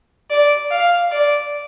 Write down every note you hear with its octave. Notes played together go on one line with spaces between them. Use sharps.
D5
F5
D5